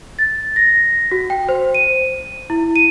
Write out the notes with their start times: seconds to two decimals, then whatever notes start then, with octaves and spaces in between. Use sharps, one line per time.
0.19 A6
0.56 A#6
1.12 F#4
1.30 G5
1.49 C5
1.75 D#7
2.50 E4
2.76 D#7